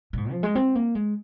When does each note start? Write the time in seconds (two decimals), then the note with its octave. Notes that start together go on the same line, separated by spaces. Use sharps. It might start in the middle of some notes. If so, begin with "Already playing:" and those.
0.13 A#2
0.17 G#2
0.31 F3
0.43 G#3
0.55 C4
0.75 A#3
0.95 G#3